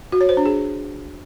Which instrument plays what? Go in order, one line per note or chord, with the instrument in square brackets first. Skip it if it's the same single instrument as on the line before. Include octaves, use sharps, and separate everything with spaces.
[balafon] F#4
C#5
C5
D4
G#4